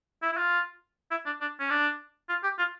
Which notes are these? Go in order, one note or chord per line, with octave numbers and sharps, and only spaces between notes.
E4
E4
F4
E4
D4
D4
C#4
D4
F4
G4
F4